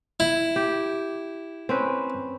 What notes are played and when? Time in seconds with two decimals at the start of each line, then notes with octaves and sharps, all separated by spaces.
0.20 E4
0.56 G4
1.69 C4 C#4 B4